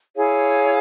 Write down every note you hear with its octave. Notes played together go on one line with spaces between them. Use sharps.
E4 G#4 C#5 F5